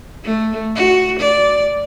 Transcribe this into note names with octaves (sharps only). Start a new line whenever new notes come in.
A3
F#4
D5